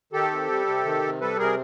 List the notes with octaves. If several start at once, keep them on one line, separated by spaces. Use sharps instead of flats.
D#3 G4 A4
C3
G3
C3
D#3
C3
G3 A4 B4
C3 G#4 A#4